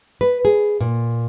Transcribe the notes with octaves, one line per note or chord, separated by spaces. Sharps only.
B4
G#4
A#2